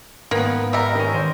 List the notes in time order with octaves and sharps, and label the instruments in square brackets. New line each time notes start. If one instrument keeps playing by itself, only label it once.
[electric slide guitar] G#2 B4 [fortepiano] D#3 B3 [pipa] A#3
[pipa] G3 A#4 [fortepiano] E5 A#5
[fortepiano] D#3 C#4
[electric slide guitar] D#3 [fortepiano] C5